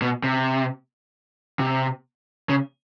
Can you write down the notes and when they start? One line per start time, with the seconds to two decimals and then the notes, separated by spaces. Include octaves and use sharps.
0.02 B2
0.24 C3
1.59 C3
2.49 C#3